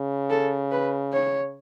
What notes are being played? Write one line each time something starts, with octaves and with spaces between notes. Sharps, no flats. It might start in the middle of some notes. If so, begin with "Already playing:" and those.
Already playing: C#3
A4
B4
C#5